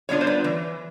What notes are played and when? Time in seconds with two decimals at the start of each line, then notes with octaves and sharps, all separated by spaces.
0.09 G3 B3 D4 F4 C#5
0.21 C5
0.27 B4
0.44 E3